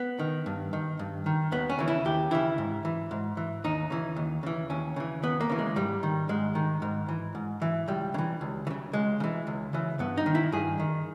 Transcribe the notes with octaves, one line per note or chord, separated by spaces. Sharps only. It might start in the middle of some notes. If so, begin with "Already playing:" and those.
Already playing: B3
D#3
G2
D#3
G2
D#3
D#2 B3
C#4
C#3 E3
E4
D#2 G4
C#3 E3 E4
G#2
E3
G#2
E3
D#2 D#4
C#3 E3
D#2
C#3 E3
D#2 C#4
C#3 E3
D#2 B3
A#3
C#3 E3
G#3
G#2 G3
D#3
G#2 G#3
D#3
G#2
E3
G#2
E3
C#2 G3
C#3
E3
C#2
E3
C#3
C#2 G#3
C#3
E3
C#2
C#3 E3
G2 B3
D#4
D#3
E4
G2 G#4
D#3